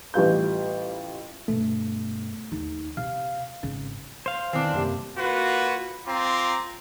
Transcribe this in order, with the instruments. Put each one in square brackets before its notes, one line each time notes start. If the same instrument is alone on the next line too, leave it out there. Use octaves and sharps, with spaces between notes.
[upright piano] A1 G3 F4 G6
[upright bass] G2 B2 [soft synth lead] A3
[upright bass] D#2 D#4
[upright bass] C3 [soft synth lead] F5
[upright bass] G#1 [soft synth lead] C#3
[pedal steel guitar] C5 F5
[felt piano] E2 [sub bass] D#3 [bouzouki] C4 D4
[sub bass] F#2 [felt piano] C3 G3 A#3
[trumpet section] A#3 F4 F#4 B4
C4 F4 A#5 D6